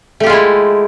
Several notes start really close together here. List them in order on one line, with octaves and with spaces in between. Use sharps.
A3 G4 F4 G#3 E4